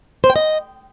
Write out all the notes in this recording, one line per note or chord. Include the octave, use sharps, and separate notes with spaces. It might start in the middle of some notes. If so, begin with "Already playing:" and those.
C5
G5
D#5